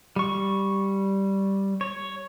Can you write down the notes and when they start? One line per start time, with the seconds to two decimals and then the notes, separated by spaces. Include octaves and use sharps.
0.16 G3 C#6
1.81 C#5